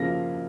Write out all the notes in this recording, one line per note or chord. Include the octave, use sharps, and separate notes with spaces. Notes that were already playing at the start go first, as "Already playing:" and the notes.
Already playing: C#3 F3 A#3 F4 F6 A#6